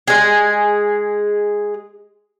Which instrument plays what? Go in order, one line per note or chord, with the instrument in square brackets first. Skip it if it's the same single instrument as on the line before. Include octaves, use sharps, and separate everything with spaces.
[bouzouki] G#3 G#4